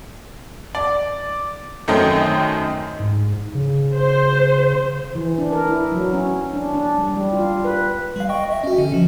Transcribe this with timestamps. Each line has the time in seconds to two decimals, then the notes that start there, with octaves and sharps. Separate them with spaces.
0.75 D5
1.88 F#2 D#3 A3 C4 D#5 G5
3.00 G#2
3.55 C#3
3.95 C5
5.15 E3
5.38 D4
5.52 A#4
5.67 E4
5.92 F#3
6.14 C#4
6.53 D4
6.74 D4
6.98 G3
7.14 G3
7.33 F4
7.65 B4
8.16 G3 F5
8.29 D#5 G5 C#6
8.50 D#5 E5
8.64 C#4 F#4
8.78 D3 C#4
8.94 F3